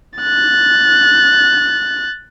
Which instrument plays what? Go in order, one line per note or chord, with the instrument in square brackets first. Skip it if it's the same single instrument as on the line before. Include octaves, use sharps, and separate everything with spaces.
[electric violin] F#6 A6